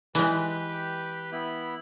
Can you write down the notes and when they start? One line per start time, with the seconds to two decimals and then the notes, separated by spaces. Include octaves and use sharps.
0.15 E3 G#3 G4 B4
1.32 B3 E4 B5